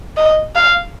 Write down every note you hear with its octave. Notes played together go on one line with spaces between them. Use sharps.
D#5
F5